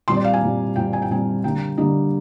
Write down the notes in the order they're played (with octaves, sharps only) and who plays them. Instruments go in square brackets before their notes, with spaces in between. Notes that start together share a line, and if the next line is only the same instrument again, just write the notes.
[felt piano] A#2 G3 C4 C6
D5
F5
G#5
A#2 G3 C4
A#2 G3 C4 G5
G#5
G5
A#2 G3 C4 G#5
D3 G3 A#3 G5
D3 G3 A#3 D#5